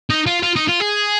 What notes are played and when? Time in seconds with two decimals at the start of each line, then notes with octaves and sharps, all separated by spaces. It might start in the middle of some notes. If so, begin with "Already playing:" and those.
0.10 D#4
0.27 F4
0.43 F4
0.56 D#4
0.68 F4
0.80 G#4